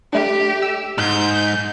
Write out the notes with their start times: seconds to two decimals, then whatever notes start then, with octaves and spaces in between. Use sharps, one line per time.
0.13 A3 D4 G4
0.62 E6
0.98 G#2 G6